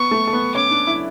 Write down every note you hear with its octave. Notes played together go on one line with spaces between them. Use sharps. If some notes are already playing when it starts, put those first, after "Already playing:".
Already playing: B3 B4 C#6
A3 A4
A4
B3 B4
C#4 C#5 D6
D4 D5
E4 E5